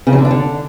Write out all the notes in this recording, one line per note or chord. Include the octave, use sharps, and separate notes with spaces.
C#3
F#3
D3
D4
D3